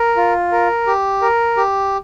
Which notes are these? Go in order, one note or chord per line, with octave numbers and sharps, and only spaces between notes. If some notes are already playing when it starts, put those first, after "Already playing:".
Already playing: A#4
F4
A#4
G4
A#4
G4